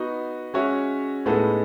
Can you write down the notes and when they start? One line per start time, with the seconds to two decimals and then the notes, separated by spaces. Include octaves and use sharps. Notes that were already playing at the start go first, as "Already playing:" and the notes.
Already playing: B3 D#4 F#4
0.54 G#3 C#4 F#4 C#5 E5
1.26 A2 G#3 B3 D#4 A4